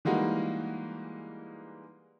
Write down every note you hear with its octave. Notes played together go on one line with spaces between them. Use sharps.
E3 G3 G#3 A#3 D#4 F#4